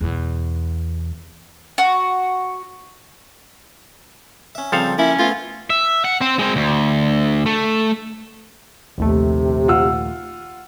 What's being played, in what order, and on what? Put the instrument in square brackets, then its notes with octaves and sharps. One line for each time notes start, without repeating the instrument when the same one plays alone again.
[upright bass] E2 B2
[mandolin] F#4
[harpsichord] C#4 E5
[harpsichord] C#3 G3 C4 [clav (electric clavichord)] F3 A4 F5
[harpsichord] A#3 [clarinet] C#4 [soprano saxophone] E4
[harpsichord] A3 B3 [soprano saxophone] F4
[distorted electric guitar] E5
F#5
C4 C5
G#3 C4
D2
A3
[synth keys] A#1 D#2 A3 [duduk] C3
[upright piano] F4 F#5 E6